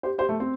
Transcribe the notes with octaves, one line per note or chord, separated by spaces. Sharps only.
G4 C5
G4 C5
A3
C4